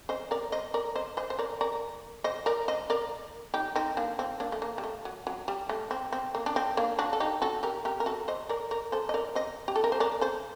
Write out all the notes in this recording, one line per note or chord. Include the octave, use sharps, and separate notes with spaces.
C5 D#5
A#4 D5
C5 D#5
A#4 D5
C5 D#5
C5 D#5
C5
A#4 D5
A#4 D5
C5 D#5
A#4 D5
C5 D#5
A#4 D5
D#4 G4
C4 D#4
A#3 D4
C4
A#3 D4
A3
A#3
G3
A3
F#3
F#3
G3
A3
C4
C4
A#3
D4
C4
A#3 D4
D4 F#4
A4
D#4 G4
F#4 A4
G4 A#4
G4 A#4
A#4
F#4 A4
C5 D#5
A#4 D5
A#4 D5
A4 C5
D#5
A#4 D5
C5 D#5
G4
A4
A#4
C5
A#4 D5
A4 C5